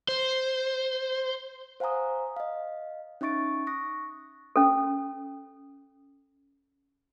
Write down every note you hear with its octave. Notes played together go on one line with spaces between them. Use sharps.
C5
C5 F5 F#5 G#5 A#5 D#6
D#5 F5
C#4 D#4 E5 C#6 A6 D7
C#6 D#6 F#6 A#6
C#4 A4